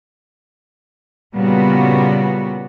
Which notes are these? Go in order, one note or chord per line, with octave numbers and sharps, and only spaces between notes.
A#2 C#3 G3 B3 F#4